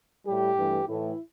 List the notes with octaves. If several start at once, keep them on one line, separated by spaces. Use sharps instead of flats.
A2 G3 G4
G2 E3 A3
A2 E3 A3 E4